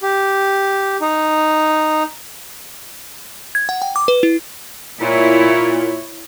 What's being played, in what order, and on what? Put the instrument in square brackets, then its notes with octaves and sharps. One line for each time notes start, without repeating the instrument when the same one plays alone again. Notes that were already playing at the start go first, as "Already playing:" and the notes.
[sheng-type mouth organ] G4
D#4
[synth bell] G#6
F#5
G5
D6
B4
E4
[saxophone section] A#2 [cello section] E4 C#5